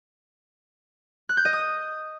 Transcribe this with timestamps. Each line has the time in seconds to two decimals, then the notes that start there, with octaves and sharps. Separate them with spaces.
1.29 F#6
1.37 G6
1.45 D#5
1.53 D#6